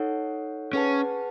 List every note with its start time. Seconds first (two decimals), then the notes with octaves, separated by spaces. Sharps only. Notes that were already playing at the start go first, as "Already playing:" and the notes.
Already playing: D#4 A4 C#5 F#5
0.73 C#4 G#4 B4 F#5 A5